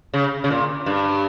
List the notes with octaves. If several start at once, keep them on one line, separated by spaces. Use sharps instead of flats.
C#3
C#3
A#2
G2